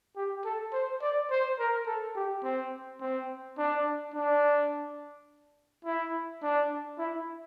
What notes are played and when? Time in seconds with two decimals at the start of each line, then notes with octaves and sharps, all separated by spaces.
0.16 G4
0.45 A4
0.73 C5
1.01 D5
1.31 C5
1.59 A#4
1.86 A4
2.16 G4
2.43 C4
3.01 C4
3.58 D4
4.14 D4
5.85 E4
6.43 D4
6.99 E4